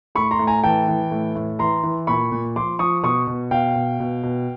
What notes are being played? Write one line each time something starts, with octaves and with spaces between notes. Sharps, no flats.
A2 B5 C#6
A#5 C6
A2
G#5 A#5
E3 G5 A5
E3
A2
A2
E3 A#5 C6
E3
A#2 B5 C#6
A#2
F3 C6 D6
F3 C#6 D#6
B2 C#6 D#6
B2
B2 F5 G5
B2
B2
B2